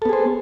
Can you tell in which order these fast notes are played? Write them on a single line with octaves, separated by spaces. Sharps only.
A4 B3 G#4 C5